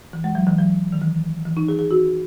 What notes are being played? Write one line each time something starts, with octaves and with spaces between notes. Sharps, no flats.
E3
G#3
F#3
E3
F#3
D#3
E3
E3
D#4
G#4
G#4
F#4